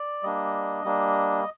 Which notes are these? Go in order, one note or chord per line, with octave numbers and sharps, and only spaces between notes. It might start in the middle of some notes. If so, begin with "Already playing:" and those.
Already playing: D5
G3 A#3 D4 D#5
G3 A#3 D4